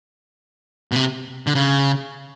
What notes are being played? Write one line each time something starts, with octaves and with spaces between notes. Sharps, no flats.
B2
C3
D3
C#3